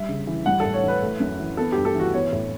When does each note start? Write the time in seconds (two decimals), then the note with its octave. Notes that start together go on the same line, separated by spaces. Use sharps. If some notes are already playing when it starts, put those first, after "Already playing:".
Already playing: G3 E5
0.09 C#3
0.27 E3
0.46 G3 F#5
0.60 A4
0.65 A2
0.74 C#5
0.83 E3 B4
1.03 A3
1.20 F#2
1.40 E3
1.57 B3 A4
1.72 G2 G4
1.85 A4
1.95 E3 F#4
2.14 B3 C#5
2.32 A2